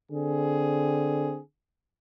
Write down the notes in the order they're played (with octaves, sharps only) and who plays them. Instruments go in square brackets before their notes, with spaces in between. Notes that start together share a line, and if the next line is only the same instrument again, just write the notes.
[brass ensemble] D3 C4 G#4